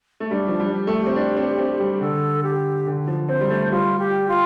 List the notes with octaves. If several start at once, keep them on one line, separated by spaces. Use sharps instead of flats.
A3
G3 D4
F3
G3
G4
A3 A4
G4
C4
D4
C4
C4
G3
D3 A4
G4
D3
F3
C4 C5
G3
A3
G3 F4
G4
F4